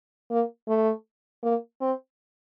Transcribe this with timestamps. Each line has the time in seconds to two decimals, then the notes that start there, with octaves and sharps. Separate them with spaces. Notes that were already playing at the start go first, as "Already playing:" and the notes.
0.31 A#3
0.68 A3
1.43 A#3
1.81 C4